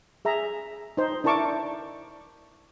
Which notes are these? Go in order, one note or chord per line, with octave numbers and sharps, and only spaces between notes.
G#4 E5 A#5
D#4 C5
D4 E4 A#4 A5 C#6 D6